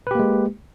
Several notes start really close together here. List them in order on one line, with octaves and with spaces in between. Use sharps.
B4 G4 A#3 G#3